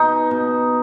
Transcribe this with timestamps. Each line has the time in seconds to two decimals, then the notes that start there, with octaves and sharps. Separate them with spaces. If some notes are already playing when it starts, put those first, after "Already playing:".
Already playing: B2 D#4
0.31 B2